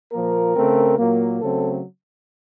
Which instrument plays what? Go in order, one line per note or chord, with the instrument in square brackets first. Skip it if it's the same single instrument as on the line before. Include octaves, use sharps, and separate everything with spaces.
[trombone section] A#2 F3 A#3 A#4
C#3 A3 C4
A#2 F#3 A#3
C#3 F#3 A3 C4 A4